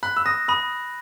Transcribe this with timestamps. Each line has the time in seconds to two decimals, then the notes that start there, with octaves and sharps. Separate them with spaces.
0.03 B5 F#6
0.17 E6
0.26 D#6 A#6
0.48 B5 D#6